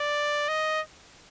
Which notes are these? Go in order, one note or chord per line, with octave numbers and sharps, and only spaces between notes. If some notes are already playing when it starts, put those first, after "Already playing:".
Already playing: D5
D#5